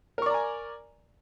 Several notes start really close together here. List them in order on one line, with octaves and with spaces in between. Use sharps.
A#4 C#6 D5 A#5 G#5